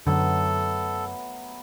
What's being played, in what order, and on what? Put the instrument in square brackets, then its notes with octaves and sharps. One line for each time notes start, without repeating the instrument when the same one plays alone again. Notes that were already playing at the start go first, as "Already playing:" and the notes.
[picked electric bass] F#2 D3 [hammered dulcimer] F#3 A3 B3 [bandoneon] A4